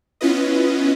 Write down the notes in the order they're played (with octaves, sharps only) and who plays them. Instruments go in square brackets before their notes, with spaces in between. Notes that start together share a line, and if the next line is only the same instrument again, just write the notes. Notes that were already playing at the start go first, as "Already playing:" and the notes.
[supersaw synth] B3 C#4 E4 F4 B4 D#5